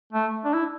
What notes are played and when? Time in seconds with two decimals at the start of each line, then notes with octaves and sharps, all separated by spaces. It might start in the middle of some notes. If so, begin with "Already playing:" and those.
0.13 A3
0.45 D4
0.54 E4